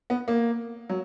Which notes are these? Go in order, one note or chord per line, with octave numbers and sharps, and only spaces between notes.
B3
A#3
F#3